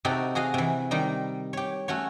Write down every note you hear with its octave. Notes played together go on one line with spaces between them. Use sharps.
C3 D#4 F#4 G4 A4
F#4 G#4 D#5 F5
C3 E3
D#3 G3 D#4
G4 C#5
A3 C#4 F#4 C#5